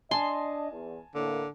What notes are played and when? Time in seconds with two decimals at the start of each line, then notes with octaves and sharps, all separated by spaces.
0.11 D4 D#5 G#5 A5 C6
0.71 E2
1.15 A2 D3 A#3